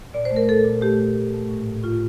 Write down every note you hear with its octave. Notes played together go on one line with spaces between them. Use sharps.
A#2 D5
C5
A3
A#4
A#2 A4
A#2
A3 G4
A3
A#2
A3
A2
A2
A2 F4